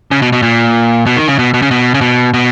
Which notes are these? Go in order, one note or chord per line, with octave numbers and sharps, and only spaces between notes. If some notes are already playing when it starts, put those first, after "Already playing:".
C#3
B2
B2
A#2
B2
D#3
C#3
B2
B2
C#3
B2
C#3
B2
B2